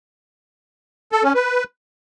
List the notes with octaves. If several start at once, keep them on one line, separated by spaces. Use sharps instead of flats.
A4
C#4
B4